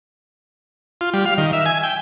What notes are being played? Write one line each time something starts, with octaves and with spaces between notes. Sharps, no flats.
F4
G3
F5
D#3
E5
G#5
G5